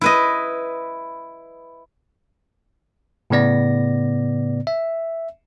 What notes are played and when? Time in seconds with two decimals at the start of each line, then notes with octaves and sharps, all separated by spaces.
0.01 E4 B4 D#5
3.30 A2 C#3 B3 D5 A#6
4.67 E5